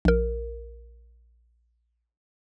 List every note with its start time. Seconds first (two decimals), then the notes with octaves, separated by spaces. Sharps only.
0.05 A#1 A#4